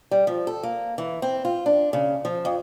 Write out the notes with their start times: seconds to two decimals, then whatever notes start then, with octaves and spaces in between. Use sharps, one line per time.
0.11 G3
0.27 F3
0.47 A4
0.63 A#3
0.98 E3
1.22 C4
1.45 F4
1.66 D4
1.93 C#3
2.25 F3
2.45 F2